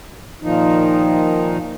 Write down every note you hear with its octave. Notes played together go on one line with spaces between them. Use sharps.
A#2 D#3 F3 D#4